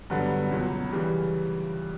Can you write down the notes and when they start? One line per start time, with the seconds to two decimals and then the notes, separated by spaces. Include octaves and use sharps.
0.10 G2 D3 F#3 B3
0.51 C#2 B2 F#3
0.92 C#3 E3 G3